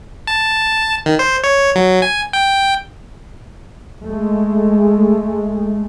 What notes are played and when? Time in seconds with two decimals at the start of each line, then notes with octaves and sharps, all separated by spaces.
0.27 A5
1.06 D#3
1.19 C5
1.44 C#5
1.75 F#3
2.02 G#5
2.33 G5
4.03 G#3 A3